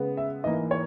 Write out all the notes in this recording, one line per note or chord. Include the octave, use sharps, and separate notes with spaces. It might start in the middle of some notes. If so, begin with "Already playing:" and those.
Already playing: C#3 G#3 B3
E5
G#2 E3 A#3 D#5
C#5